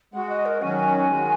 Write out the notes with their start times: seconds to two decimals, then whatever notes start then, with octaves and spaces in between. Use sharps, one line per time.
0.13 G#3 F#4 F#5
0.29 D#5
0.45 A#4
0.62 D#3 F#3 C#4 F#4 G#5
0.77 G#5
1.09 D#3 G#3 F#4